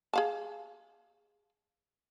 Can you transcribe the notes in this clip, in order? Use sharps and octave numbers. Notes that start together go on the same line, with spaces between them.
G#4 F5 A5